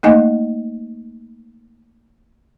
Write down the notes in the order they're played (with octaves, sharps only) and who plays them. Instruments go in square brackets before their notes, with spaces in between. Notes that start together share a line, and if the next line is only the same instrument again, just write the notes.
[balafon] A3 A#3 D#4 D#5 G#5